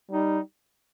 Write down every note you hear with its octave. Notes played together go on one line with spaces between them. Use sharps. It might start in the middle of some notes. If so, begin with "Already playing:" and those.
G3 D#4